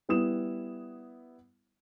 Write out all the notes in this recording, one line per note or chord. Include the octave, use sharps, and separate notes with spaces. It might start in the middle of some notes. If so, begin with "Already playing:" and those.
G3 B3 E4 D#6 E7